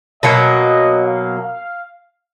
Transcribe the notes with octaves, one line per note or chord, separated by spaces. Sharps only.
B2 F#3 A#3 D#5
F5
F5